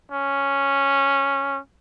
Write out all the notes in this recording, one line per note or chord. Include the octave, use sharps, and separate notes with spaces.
C#4